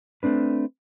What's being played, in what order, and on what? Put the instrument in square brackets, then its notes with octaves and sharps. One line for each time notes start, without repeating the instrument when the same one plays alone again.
[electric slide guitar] A3 C4 D4 B4